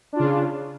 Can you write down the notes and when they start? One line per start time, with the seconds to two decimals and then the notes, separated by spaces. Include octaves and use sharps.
0.13 D4
0.16 F4
0.20 C#3